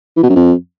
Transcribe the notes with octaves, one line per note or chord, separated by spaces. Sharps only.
E3
B2
F#2
F2